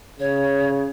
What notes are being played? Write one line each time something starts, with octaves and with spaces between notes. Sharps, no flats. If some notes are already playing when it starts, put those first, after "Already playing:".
C#3 C#5